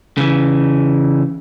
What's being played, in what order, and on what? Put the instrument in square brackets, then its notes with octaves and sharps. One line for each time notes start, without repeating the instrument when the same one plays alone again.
[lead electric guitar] C#3 E3